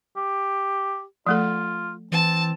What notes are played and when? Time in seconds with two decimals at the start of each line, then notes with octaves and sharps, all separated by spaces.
0.16 G4
1.27 F3 A3 F4 A4
2.12 E3 C4 A5